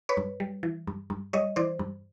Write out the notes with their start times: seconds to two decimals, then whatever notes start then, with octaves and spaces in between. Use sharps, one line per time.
0.09 B4 C#5
0.17 G2
0.40 G3
0.63 E3
0.87 G2
1.10 G2
1.33 G3 C#5 D#5
1.56 E3 C5 D5
1.79 G2